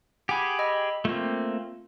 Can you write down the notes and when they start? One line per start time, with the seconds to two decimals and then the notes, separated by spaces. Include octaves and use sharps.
0.29 G4 G#4 F#5 G#5 B5
0.59 D#5 B5 E6
1.05 A3 A#3 C4 F4